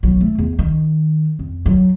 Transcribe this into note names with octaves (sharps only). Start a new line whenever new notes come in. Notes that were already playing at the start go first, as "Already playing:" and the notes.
B1 F#3
A3
E2
D#3
F2
F#3